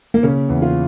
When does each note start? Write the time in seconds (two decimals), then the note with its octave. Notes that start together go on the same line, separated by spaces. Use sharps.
0.14 A#3
0.23 C#3 C#4
0.49 E2
0.62 F4